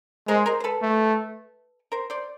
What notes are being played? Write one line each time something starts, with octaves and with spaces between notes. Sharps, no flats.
G#3 A#4 C5
A#4 C5
C5
A4 B4
A3
A#4 C5
C5 D5